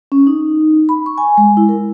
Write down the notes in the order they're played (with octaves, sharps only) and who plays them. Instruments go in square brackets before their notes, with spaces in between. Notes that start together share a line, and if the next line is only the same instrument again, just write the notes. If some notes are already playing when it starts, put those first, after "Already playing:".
[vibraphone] C#4
D#4
B5
C#6
G#5
G#3
E4
A#4